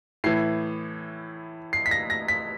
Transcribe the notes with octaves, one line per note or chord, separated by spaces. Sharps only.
A2 E3 C7
C7
B6
A#6
A#6
B6